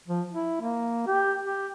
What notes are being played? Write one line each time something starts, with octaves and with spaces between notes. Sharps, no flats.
F3
E4
A#3
G4
G4